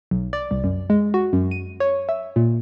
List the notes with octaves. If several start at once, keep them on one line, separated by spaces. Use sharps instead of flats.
B1
D5
C2
F#2
G#3
F#4
F#2
D#7
C#5
E5
A#2